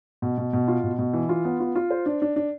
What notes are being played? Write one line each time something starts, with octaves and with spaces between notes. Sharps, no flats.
B2
B2
B2
F4
B2
B2
E3
F4
B3
F4
F4
C5
D4
D4
D4